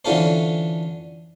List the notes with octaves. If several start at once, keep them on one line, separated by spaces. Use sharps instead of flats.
D3 E3 C#4 F4 A4 C5